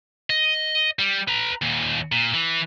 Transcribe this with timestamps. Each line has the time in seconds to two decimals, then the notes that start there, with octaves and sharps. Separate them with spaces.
0.30 D#5
0.99 G3
1.28 B4 A#5
1.62 D#2 A#2
2.12 A#2
2.34 E3